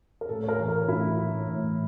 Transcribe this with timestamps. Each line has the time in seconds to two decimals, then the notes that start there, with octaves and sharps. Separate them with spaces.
0.21 A#4
0.29 A2 A4
0.43 C#5
0.49 A#4
0.58 E3
0.69 A#4
0.88 A2 E4
1.18 E3
1.47 A2